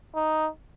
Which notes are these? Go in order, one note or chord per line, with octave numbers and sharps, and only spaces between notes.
D#4